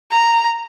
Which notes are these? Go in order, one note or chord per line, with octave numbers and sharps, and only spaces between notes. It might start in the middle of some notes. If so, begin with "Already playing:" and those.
A#5